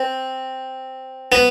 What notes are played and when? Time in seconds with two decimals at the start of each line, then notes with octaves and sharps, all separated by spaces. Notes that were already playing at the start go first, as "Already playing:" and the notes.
Already playing: C4
1.32 B3